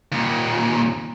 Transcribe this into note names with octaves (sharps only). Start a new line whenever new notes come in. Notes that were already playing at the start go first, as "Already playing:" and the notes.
D#2 A#2